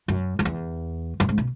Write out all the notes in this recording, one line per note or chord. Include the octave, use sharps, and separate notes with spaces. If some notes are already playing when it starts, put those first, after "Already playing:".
F#2
F#2
E2
F#2
G#2
B2